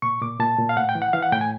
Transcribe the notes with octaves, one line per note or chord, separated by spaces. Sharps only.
A#2 C#6
A#2 D6
A#2 A5
A#2
F5
A2 F#5
G5
E3
F#5
E3 F5
F#5
A2 G5
G#5